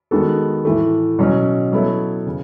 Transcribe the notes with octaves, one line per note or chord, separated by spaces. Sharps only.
D#3 G#3 B3 F#4 A4
A2 E3 A3
B2 F#3 C#4
F#3 B3 E4 A4 C#5
C#3